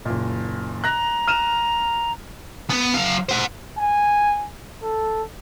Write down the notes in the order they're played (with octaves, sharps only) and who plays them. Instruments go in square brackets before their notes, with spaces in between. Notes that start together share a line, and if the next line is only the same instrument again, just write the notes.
[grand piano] F#1 A#2
[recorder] A#5 [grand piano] F#6 A#6
[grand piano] F6 D#7 E7
[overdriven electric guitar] B3
F#3 F5
C5 F#5
[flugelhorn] G#5
A4